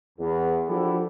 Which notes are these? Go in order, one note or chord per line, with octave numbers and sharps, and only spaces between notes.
E2
F3 D4 E4 F#4 G4 A4